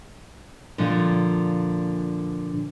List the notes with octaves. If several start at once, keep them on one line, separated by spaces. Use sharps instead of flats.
A#2 D3 F3 F4